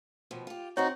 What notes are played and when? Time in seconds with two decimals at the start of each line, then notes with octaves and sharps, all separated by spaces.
0.31 D#2 B2 F3
0.47 F4 G4
0.77 C4 D#4 F#4 C5 C#5 F#5